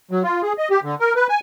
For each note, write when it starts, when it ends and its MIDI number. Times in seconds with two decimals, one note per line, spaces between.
0.11 0.23 54
0.23 0.42 65
0.43 0.53 68
0.58 0.68 75
0.70 0.80 67
0.84 0.95 50
1.00 1.13 70
1.16 1.27 71
1.29 1.40 80